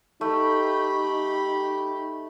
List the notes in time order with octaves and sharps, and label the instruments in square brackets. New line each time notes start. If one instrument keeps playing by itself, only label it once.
[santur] A3 [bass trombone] D#4 [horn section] G4 B5